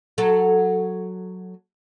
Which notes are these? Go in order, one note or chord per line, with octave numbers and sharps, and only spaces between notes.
F#3 A4